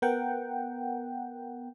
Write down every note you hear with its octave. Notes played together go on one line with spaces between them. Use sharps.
B3 A#4 F#5 G5